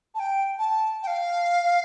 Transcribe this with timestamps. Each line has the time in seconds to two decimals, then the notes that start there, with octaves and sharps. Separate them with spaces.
0.15 A5
0.19 G5
0.58 A5
1.03 G5
1.07 F5